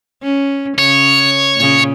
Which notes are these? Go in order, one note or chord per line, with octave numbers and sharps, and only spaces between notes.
C#4
C#3 C#5
A#2 C#3